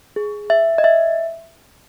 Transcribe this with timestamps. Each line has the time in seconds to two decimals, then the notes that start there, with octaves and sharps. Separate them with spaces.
0.16 G#4
0.50 E5
0.78 D#5
0.84 E5